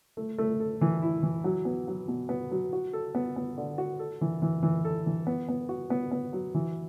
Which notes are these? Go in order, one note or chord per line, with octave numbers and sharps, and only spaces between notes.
A3
A3
A4
E3
E4
E3
F#3
B3
F#3
B2
B3
F#3
F#4
A4
B3
B3
D3
F#4
A4
E3
E3
E3
A4
E3
B3
B3
F#4
B3
B3
F#3
E3